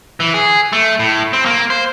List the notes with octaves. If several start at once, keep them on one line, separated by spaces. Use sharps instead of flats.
E3
G#4
A3
A2
C4
A#3
C5